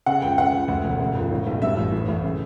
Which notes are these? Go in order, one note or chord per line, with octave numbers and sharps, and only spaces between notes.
C#3 F#5
C#2 G5
C#3 F#5
C#2
D2
E1
C#3
C#2
A2
B1
G2 E5
A1
A2
A1
C#3